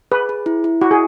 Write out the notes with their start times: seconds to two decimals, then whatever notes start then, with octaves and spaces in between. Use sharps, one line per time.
0.12 G#4 B4
0.29 G#4
0.46 E4
0.64 E4
0.81 E4 F#4
0.91 G#4